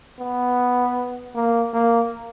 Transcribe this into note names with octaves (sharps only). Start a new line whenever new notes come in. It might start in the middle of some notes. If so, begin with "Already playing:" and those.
B3
A#3
A#3